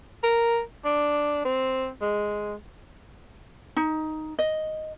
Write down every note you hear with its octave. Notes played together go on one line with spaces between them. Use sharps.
A#4
D4
C4
G#3
D#4
D#5